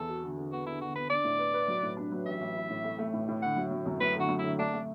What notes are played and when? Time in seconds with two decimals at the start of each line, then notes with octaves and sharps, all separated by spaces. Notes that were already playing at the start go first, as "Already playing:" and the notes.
Already playing: E2 A4
0.09 F#4
0.23 D3
0.37 D3
0.52 B3 F#4
0.66 D3 E4
0.81 D3 F#4
0.95 B3 B4
1.10 D4 D5
1.24 A2
1.39 B4
1.54 B4
1.68 F#3
1.83 A2
1.97 D4
2.12 F#3
2.26 A1 E5
2.41 A1
2.55 E4
2.70 A2
2.84 A3
2.98 A3
3.14 A2
3.28 A2
3.42 D3 F#5
3.56 F#3
3.71 F#3
3.86 F#2
4.00 F#3 B4
4.16 D3 F#4
4.29 F#3
4.39 D3 E4
4.58 A3 D4
4.74 A3